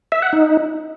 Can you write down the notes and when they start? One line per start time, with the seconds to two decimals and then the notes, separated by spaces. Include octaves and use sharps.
0.12 E5
0.22 F#5
0.33 D#4